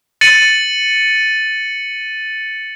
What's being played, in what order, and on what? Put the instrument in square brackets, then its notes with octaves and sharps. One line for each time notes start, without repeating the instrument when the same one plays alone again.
[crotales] A6 C#7 D#7 F#7